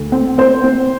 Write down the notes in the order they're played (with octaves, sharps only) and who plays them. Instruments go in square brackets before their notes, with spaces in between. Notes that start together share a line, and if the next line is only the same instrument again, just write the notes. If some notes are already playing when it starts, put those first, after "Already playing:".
Already playing: [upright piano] D2
C4
C4 C5
C4